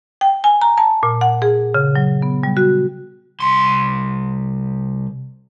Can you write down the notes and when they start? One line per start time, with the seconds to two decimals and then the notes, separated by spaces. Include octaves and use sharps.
0.21 G5
0.44 G#5
0.61 A#5
0.78 A5
1.03 A#2
1.21 F#5
1.42 G#4
1.74 C#3
1.96 F#3
2.22 B3
2.43 G3
2.57 F#4
3.40 C2 C6